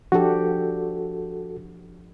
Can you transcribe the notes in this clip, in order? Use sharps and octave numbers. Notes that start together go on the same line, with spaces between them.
F3 D4 F#4 G4 A4